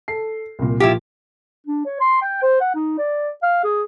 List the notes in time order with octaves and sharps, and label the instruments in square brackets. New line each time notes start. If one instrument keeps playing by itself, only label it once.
[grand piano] A4 C7
C2 A#2
[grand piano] A#2 F3 [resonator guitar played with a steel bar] E4 F4 G4
[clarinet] D4
C#5
C6
G5
C5
F#5
D#4
D5
F5
G#4